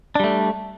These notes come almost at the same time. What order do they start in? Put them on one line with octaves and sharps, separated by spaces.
D4 G3 A3